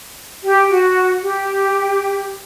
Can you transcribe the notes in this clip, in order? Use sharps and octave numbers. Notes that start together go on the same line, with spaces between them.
G4
F#4
G4